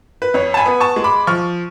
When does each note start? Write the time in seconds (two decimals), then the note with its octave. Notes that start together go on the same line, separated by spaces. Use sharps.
0.22 B4
0.34 F2 C#5
0.54 A5
0.57 G#5 B5
0.66 B3
0.80 A5 C#6
0.96 G#3
1.04 B5 D6
1.27 F3 C#6 F6